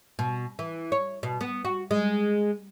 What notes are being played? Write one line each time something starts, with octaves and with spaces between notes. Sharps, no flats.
B2
E3
C#5
B2
B3
F#4
G#3